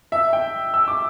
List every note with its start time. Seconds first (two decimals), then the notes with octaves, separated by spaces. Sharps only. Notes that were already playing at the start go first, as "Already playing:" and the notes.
0.12 E5
0.33 G5
0.74 E6
0.88 D6